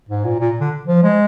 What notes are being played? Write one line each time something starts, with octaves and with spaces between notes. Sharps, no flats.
G#2
A#2
A#2
D3
F3
G#3